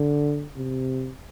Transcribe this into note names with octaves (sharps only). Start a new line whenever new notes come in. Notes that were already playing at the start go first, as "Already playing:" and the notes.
Already playing: D3
C3